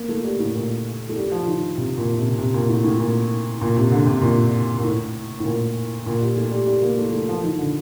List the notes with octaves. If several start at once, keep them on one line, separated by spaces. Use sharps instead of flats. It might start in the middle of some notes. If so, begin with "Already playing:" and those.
Already playing: A#3
A3
G3
A2
A#2
A3
G3
F3
D#3
C3
A#2
C3
C3
A#2
A2
A2
A#2
A#2
C3
D3
C3
A#2
A#2
A2
A2
A#2
A#2
G3
A3
G3
G3
A#3
A3
A3
F3
F3
D#3
D3